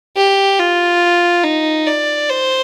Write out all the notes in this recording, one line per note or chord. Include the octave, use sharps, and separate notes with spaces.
G4
F4
D#4
D5
C5